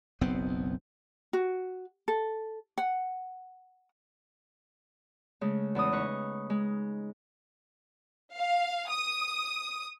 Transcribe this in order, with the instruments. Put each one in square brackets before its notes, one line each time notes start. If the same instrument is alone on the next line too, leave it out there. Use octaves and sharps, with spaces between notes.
[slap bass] F#1 B1 B3 C4
[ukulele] F#4
A4
F#5
[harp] C#3 G#3 A3
E2 E3 C#4 D#6
C#3 D#4 B4 C#6
G#3
[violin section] F5
D#6